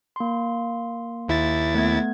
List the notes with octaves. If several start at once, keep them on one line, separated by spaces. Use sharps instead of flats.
A#3 C6
D#2 E4 A6
A3 B3 G#6